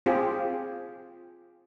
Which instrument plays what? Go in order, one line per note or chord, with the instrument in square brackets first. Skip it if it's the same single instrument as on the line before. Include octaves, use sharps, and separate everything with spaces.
[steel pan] C4 F4 G4 G#4